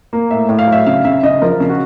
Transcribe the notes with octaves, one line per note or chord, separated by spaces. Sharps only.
A#3
A2 E5
A2
F5
F#3 E5
C#3 F5
C#3 E5
C#3 D#5
F3 A#4
C#3
F#4